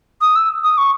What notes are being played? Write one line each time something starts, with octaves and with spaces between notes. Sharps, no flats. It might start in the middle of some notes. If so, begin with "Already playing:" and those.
D#6
E6
D#6
C#6